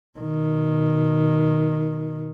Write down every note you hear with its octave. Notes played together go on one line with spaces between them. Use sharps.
B2 D#3